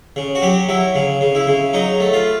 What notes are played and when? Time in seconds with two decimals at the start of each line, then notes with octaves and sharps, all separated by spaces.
0.16 C#3
0.35 F#4
0.42 F#3 G4
0.69 F#3 E4
0.95 C#3
1.21 C#3
1.35 E4
1.47 C#3
1.73 F#3 D#4
2.00 A3
2.13 F4